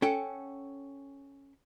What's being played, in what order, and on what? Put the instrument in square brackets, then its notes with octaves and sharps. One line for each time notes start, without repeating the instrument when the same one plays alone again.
[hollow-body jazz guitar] C#4 A4 F#5 G5